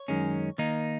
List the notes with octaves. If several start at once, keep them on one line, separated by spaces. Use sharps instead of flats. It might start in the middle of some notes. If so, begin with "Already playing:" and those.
Already playing: C#5
F#2 D#3 G#3 C#4
D#3 A#3 D#4